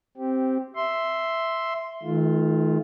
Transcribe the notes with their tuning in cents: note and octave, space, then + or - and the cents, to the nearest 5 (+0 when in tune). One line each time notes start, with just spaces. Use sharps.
C4 +0 G4 -10
E5 +0 C6 +0
D#3 +35 A3 -35 F4 +0